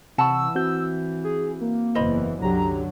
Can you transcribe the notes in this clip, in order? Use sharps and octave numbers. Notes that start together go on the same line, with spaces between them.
C3 E3 F#5 A5 B5 C#6 E6
C4 F#4 G6
G#4
A#3
F#1 E2 E3 C5 D#5 B5
C2 F#2 D3 F#3 G4 A#5